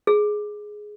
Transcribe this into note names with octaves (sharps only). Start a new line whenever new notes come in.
G#4